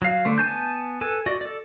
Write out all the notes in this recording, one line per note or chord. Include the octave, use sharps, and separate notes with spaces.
F#3 F5
D3 A3 C5
B3 G#5 A5 G6
A4 B4 G#5
F#4 D5 D#5
A4 D5